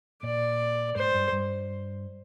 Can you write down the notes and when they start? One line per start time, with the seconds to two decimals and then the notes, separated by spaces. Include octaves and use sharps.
0.23 A#2 D5
0.96 G#2 C5
1.14 G2
1.32 G2